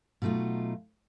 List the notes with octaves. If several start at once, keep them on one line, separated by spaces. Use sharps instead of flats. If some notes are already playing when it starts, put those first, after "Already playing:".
B2 F#3 A3 D#4 F4